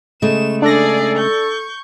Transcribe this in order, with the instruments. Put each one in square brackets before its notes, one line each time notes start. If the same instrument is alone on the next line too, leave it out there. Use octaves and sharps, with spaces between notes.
[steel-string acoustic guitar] C#3 G#3 A3 [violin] E7
[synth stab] D4 A#6 [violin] G#4 D5 [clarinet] A4
[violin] C#6 G6